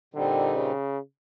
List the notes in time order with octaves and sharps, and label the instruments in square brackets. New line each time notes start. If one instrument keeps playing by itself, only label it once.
[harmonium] A#2 G3 C4 D#4 [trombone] D3
[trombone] C#3